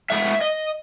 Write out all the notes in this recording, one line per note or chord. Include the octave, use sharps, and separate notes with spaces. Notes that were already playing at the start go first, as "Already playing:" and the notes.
A2 G#3 B3 E5
D#5